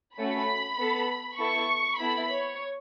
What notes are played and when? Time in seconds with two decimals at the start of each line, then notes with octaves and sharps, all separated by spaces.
0.18 A3 C#4 F#4 A4 B5
0.78 B3 A4
1.38 B3 E4 A4 C#6
1.99 B3 E4 A4 B5
2.29 C#5